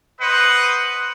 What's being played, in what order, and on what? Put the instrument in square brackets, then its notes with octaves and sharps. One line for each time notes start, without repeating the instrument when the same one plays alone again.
[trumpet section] B4 C5 D#5 F#5